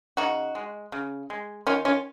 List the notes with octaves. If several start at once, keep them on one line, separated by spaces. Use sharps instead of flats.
C#3 D#4 F#4
G#3
C#3
G#3
D#3 C#4 F4
C#4 F4